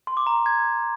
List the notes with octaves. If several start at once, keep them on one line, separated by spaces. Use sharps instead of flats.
C6
D6
A#5
D6
G#6